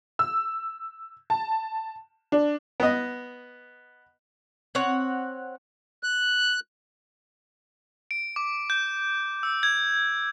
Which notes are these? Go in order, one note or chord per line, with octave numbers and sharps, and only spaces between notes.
E6
A5
D4
B3 D#5
C4 C#5 F#5
F#6
D7
D6
G6
E6
G#6